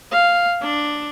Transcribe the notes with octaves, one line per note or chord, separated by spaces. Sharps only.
F5
D4